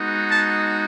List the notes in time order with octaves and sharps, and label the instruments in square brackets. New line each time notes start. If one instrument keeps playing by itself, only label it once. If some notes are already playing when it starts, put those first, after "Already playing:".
Already playing: [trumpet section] G#3 B3 D#4 F#4
A5